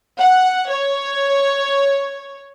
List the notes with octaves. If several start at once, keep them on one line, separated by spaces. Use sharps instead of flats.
F#5
C#5